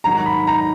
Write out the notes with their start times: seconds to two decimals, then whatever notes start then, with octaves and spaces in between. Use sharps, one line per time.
0.04 G#2 D#3 F#3 A#5
0.26 B5
0.47 A#5